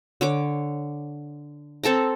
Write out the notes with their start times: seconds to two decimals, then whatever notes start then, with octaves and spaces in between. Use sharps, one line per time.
0.21 D3 C#5 D6
1.83 C4 A4 A5 A#5